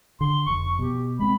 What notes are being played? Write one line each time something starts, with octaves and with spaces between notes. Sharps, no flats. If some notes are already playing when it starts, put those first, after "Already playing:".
D3 C6
F1 F2 C#6
B2 G4
G#3 C4 B5